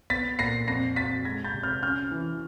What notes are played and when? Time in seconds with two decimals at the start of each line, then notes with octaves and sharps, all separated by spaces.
0.10 B3 A6 B6
0.39 A#2 A#6 C7
0.67 F2 A#6 C7
0.96 F2 A6 B6
1.25 G#3 G#6 A#6
1.44 G6 A6
1.54 C3
1.63 F6 G6
1.83 C#4 F6 G6
2.11 E3